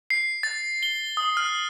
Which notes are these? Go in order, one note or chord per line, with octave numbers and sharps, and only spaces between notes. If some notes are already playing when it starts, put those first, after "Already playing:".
C7
A6
G7
D#6
F6